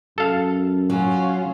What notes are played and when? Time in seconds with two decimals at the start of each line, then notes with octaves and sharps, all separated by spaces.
0.18 F#2 A4 F5
0.90 F#3 C#4 F4